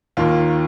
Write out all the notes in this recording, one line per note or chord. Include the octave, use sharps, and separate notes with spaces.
D#2 D#3 A#3 F4